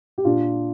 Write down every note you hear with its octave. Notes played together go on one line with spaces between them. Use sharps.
G4
A#2 D4 F4